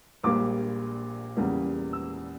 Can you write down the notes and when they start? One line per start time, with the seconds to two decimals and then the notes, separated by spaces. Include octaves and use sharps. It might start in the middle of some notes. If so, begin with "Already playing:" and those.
0.23 A#1 A#2 G3 A#3 D6
1.36 E2 C#3 G3 A#3
1.93 E6